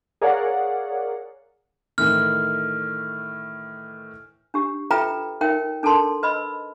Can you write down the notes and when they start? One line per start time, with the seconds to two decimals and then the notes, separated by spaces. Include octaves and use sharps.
0.21 G#4 A#4 C#5 D5 F5 F#5
1.98 A2 D#3 E3 F6
4.54 D4 G4
4.91 F4 A4 B4 E5 G5 A#5
5.41 D#4 A#4 C#5 E5 G5
5.83 D4 A4 A#4 A5 C6
6.23 B4 D#5 B5 E6